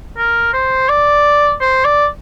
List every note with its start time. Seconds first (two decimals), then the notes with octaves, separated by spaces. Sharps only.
0.17 A#4
0.53 C5
0.89 D5
1.61 C5
1.85 D5